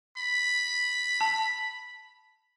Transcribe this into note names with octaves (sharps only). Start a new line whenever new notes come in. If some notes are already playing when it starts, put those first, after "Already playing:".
B5
A5